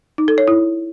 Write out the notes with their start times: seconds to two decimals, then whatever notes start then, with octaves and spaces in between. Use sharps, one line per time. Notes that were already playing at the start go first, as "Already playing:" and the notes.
0.18 D#4
0.28 A4
0.38 C#5
0.48 E4